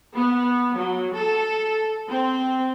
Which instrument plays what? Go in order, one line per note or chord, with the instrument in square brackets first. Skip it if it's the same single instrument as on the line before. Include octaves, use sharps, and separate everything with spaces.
[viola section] B3
F#3
A4
C4